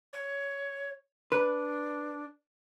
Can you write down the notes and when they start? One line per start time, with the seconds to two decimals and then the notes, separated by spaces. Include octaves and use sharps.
0.13 C#5
1.32 D4 B4